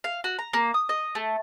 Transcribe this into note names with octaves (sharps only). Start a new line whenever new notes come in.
F5
F#4
A#5
A#3
D#6
D#5
A3